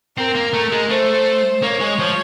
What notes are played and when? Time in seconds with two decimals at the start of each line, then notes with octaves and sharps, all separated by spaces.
0.17 C4 A#4
0.35 A#3
0.53 A3
0.72 G#3
0.89 A3 C5
1.62 A#3 C#5
1.80 G#3
1.99 F3